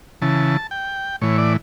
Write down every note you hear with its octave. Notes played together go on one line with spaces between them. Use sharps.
C#3 E3 A5
G5
A2 E3 C#5
D5